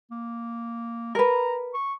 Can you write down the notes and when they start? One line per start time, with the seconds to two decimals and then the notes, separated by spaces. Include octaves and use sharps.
0.11 A#3
1.15 A#4 B4 A#5
1.74 C#6